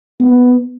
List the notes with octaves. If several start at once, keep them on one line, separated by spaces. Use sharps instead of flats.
B3